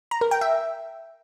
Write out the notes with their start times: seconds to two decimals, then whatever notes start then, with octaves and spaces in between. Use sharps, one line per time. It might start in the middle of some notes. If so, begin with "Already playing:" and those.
0.11 A#5
0.21 A#4
0.31 G5
0.41 E5